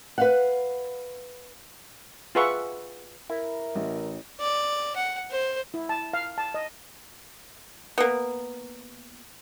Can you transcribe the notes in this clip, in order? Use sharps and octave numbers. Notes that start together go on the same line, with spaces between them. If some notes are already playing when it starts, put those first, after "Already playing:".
B4 F5 F#5
F4 G#4 B4 E5 F#5 C#6
E4 A#4
A1
D5
F#5
C5
E4
A5
F5
A5
D#5
A#3 B3